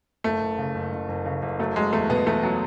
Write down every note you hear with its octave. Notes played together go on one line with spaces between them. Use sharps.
F#1 A3
F#1
C#3
F#1
F#1
F#1
C#3
F#1
F#3 A3
F#3 G#3
E2 A3
B2 B3
E2 A3
F#3